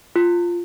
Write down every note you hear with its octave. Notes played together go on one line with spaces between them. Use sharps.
F4